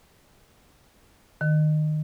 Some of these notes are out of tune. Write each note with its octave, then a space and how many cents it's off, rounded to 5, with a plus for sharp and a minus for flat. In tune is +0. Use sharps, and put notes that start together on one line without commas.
D#3 -25